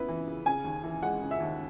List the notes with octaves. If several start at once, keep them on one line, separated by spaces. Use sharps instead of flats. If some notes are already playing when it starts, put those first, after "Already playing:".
Already playing: C#3 B3 E4 B4
E3
C#3
C#3 G#5
D#2
E3
G#3 F#5
C#3
E5
D#2